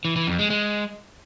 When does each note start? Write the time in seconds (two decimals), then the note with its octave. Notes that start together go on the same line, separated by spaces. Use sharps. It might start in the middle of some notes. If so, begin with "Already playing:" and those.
0.05 E3
0.16 E3
0.27 F2
0.39 G#3
0.50 G#3